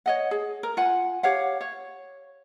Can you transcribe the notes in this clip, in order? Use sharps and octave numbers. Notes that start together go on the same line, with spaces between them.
C#5 D#5 F#5
G#4
A#4
F4 F#5 G#5
G4 C#5 F5 F#5
C#5